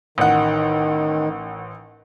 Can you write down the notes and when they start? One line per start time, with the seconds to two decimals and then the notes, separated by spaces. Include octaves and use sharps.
0.18 A1 D#3 F#5